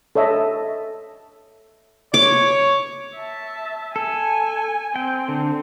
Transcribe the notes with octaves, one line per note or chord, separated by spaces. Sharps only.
A4 C#5 D#5 E5
C#5 D6
E5 A5
A4 G#5
C4 G5
D3